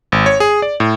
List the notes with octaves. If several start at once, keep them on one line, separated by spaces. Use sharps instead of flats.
G#1
C#5
G#4
D5
A2